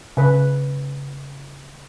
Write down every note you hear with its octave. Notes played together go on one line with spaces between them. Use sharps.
C#3 B4